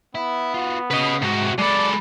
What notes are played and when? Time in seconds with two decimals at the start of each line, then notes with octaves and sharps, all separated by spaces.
0.15 B3 E4
0.54 F4 F#4
0.91 C#3 B4 D#5
1.22 G#2 C3 F#4
1.59 F#3 G#3 A4 D5 B5